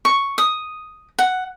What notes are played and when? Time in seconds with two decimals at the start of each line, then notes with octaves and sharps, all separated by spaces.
0.05 C#6
0.38 D#6
1.19 F#5